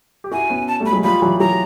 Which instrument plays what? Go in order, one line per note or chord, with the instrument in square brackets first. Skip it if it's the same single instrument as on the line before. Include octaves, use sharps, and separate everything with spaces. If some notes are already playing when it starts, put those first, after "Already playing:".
[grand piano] G4
[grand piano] E4 F#4 [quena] G#5
[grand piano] B3 C#4
[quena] A5
[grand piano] G3 A3
[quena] B5
[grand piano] F#3 G#3
[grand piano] F3 G3 [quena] B5
[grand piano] E3 F#3
[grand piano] E3 F#3 [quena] A#5